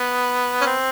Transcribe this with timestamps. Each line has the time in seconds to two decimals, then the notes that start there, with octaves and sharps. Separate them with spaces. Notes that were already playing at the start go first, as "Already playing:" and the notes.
Already playing: B3
0.61 C#4
0.66 C4